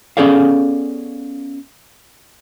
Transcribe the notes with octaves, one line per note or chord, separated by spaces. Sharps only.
B3 C#4 G#4 A4 D5 F5